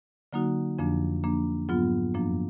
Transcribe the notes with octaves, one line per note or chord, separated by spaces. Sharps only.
D3 F#3 A#3 D#4 F#4
F2 D3 F3 A#3 D4
F3 A#3 D4
G#2 F#3 B3 F4
F#2 F3 A#3 D4